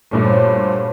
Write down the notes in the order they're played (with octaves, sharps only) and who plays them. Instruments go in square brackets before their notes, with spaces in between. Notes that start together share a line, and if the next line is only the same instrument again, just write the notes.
[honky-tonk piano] G2 A#2 A3 [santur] C#4 A4 B4
[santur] F#3 [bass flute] C5